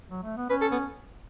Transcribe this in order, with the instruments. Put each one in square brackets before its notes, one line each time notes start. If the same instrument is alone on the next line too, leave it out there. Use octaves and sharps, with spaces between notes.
[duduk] F#3
A3
B3
[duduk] C#4 [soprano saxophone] B4
[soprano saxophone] A4
B3